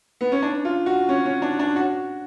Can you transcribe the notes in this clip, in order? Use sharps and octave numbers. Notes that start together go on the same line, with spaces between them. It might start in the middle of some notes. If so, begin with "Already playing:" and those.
B3
C#4
D4
F4
F#4
C#4
C#4
D4
D4
F#4